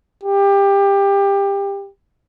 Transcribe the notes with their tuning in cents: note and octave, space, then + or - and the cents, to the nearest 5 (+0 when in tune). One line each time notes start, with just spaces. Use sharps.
G4 +20